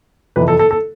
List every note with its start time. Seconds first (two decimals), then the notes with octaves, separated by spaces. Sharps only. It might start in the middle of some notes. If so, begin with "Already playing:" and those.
0.36 F2 C3 E3 B4
0.48 A4
0.59 A4
0.71 A4